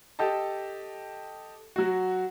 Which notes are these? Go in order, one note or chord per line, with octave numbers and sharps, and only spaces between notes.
G4 A4 D#5 A5
F#3 F#4